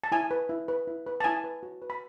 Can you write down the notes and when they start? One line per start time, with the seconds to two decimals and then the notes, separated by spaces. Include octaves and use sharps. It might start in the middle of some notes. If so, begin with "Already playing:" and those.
0.04 A5
0.12 E4 G#5
0.31 B4
0.49 E4
0.68 B4
0.87 E4
1.07 B4
1.20 A5
1.24 E4 G#5
1.44 B4
1.63 F#4
1.82 B4
1.90 B5